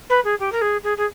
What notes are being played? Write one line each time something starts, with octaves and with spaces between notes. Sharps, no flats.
B4
G#4
G4
A#4
G#4
G#4
G#4